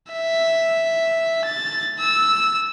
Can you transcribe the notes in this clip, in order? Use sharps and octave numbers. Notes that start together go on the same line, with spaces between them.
E5
A6
E6